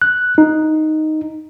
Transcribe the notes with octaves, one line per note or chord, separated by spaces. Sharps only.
F#6
D#4